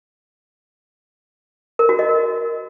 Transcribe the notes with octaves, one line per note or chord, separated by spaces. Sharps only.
A#4
F#4
D#5
A#4